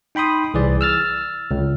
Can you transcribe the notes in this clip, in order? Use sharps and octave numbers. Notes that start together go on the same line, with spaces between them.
D#4 G5 B5 C6 D#6
C2 E3 G#4 D5
E6 F6 A6
C#2